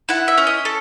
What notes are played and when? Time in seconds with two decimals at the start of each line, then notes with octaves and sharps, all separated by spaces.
0.09 E4 F#5
0.28 E5
0.38 C#4
0.47 D#5
0.65 A4